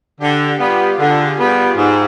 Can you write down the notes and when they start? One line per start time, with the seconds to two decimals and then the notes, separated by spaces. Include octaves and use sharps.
0.20 D3 G4
0.60 G3 B3 F4
0.99 D3 G#4
1.39 G3 B3
1.78 G#2